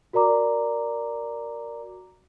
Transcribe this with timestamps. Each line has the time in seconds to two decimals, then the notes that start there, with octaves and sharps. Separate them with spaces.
0.13 F#4 A#4 D5 A#5 D6